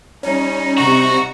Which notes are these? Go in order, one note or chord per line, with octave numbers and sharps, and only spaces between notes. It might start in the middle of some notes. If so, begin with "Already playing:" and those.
G3 C#4 D#4
C3 F#4 A#5 C#6